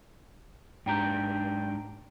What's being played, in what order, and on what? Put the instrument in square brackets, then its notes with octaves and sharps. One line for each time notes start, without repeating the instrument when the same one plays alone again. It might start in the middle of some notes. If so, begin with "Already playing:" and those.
[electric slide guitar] G#2 D4 G4 [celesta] G5 A#5 G6